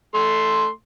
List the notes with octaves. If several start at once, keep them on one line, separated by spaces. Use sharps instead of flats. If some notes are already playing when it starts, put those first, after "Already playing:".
A3 C6